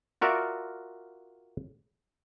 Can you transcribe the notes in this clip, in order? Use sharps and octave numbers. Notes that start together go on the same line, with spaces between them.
F4 F#4 A#4 D5 E5